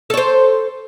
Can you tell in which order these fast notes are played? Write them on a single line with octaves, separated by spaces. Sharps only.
A4 C#5 C5